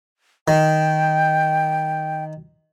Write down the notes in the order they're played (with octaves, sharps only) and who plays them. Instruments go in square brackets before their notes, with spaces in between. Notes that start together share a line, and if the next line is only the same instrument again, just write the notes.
[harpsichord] D#3 [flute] G5